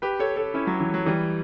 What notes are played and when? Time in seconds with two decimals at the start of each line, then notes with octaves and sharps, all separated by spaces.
0.02 G4 B4
0.19 A4 C#5
0.36 A4 C#5
0.54 C#4 E4
0.67 F#3
0.80 E3
0.94 F#3
1.06 E3 G3